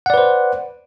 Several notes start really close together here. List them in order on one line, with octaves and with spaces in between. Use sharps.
F#5 D5 B4 C5